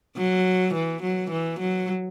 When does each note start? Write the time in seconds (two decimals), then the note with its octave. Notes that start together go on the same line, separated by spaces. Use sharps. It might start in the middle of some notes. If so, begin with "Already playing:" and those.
0.17 F#3
0.74 E3
1.02 F#3
1.30 E3
1.60 F#3